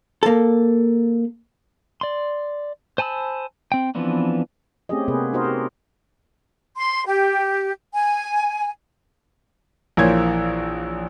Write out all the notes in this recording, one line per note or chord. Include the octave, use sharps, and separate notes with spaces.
A#3 A4
D5 C6
C5 G#5 A5 B5 E6
C4 G5
E3 F3 B3 C4 D4
A3 C4 C#4 G4 G#4 D#5
C3 A#3 B3 G#4 B4
D#4 F#4 A#4 C5 D#5
G4
C6
G4
G#5
A#1 E3 A#3 C5 C#5 G#6